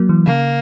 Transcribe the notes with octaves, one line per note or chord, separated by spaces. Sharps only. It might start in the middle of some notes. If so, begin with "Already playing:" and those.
Already playing: F#3 A#3
E3
C#3 A#3